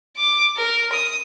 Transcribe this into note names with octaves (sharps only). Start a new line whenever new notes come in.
D6
A#4
D#6